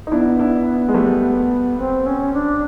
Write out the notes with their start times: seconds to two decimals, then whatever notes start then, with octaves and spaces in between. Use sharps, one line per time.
0.07 D#4
0.11 B3 D4 E4
0.39 D4 E4
0.88 G#3
0.94 G3 A3
1.78 C4
2.06 C#4
2.34 D4